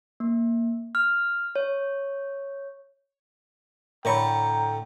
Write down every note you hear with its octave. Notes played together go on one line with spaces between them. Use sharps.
A#3
F6
C#5
A2 D3 A#4 C#5 G5 A#5 B5 C#6